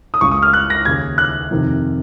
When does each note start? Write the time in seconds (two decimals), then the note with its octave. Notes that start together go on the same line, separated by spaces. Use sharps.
0.14 D#6
0.21 C#2 C#3 C#6
0.32 D#6
0.42 F6
0.53 F#6
0.70 A#6
0.85 D#2 C#3 G#6
1.18 F#6
1.51 F2 C3 D#3